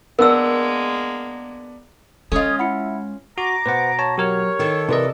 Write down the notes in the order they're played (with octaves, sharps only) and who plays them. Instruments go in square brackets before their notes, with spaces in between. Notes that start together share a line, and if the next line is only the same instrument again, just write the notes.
[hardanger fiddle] G#3 A#3 [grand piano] B3 D4 [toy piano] A#4 E6
[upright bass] G#3 [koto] C#4 F4 [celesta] A4 D#5 [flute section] D#6 G#6
[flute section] E4 [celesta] F#5 B5 C#7
[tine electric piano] F#4 [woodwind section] A#5 [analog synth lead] D6
[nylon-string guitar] B2 [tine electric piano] B4 C5 F#5
[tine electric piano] C#5 A5
[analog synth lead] F#3 [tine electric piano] G4 A#4 F6 [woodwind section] C#5
[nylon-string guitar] D#3 [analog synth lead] A4
[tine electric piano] C3 D5 D#5 [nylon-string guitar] E3 A#4